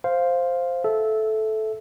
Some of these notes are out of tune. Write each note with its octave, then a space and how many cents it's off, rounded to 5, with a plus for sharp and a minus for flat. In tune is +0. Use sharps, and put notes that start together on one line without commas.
C5 +0 F5 +0
A4 -15 E5 +0